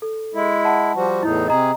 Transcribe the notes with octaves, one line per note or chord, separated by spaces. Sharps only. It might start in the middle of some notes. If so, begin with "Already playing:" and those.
A4
G#3 E4
F#5 A5
F3 G3 F#4
E2 A2 D#4 E4
C3 G#4 D#5 A#5